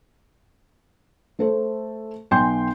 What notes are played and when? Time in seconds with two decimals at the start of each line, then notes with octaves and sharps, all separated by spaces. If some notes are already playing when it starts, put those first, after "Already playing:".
1.39 A3 A4 C5
2.31 B1 G5 G#5 C6 G6